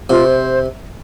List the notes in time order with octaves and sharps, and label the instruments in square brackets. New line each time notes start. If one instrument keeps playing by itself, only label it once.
[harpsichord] C3 [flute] F4
[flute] C5